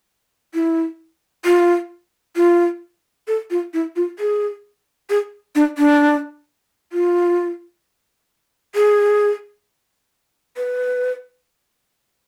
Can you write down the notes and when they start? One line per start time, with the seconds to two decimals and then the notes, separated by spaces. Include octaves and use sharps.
0.54 E4
1.45 F4
2.36 F4
3.28 A4
3.50 F4
3.74 E4
3.96 F4
4.19 G#4
5.10 G#4
5.55 D4
5.78 D4
6.93 F4
8.75 G#4
10.57 B4